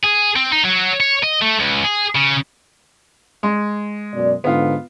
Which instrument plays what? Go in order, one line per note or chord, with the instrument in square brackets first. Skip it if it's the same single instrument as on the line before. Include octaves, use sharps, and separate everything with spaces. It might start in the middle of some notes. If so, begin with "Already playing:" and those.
[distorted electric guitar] G#4
C4
D#4
F#3
C#5
D#5
A3
C#2
G#4
C#3
[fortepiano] G#3
[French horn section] F#2 B2 D5
[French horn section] G#2 D3 [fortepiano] B3 F4